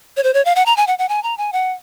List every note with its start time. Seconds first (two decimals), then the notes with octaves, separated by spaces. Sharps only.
0.17 C#5
0.23 C5
0.34 C#5
0.45 F5
0.56 F#5
0.66 A#5
0.77 G#5
0.87 F#5
0.99 F#5
1.09 G#5
1.23 A#5
1.38 G#5
1.53 F#5